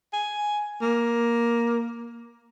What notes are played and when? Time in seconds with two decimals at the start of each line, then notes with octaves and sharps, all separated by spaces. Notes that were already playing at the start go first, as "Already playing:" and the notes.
0.14 G#5
0.82 A#3